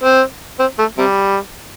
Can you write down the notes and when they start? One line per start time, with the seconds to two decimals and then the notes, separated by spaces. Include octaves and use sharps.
0.03 C4
0.59 C4
0.79 A3
0.98 C3 G3